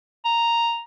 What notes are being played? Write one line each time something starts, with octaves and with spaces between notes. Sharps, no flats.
A#5